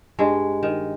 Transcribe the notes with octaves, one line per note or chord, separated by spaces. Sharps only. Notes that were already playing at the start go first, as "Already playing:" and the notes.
G2 G#3
D#3